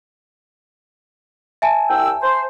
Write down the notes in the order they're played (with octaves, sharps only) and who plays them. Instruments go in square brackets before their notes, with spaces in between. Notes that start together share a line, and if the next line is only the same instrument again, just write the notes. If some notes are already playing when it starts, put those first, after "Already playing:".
[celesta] E5 G#5 A5
[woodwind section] C2 G5 E6
C5